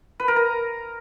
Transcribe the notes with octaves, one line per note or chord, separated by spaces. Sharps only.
B4
A#4
A#5